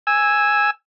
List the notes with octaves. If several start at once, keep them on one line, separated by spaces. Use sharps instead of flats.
G#5 E6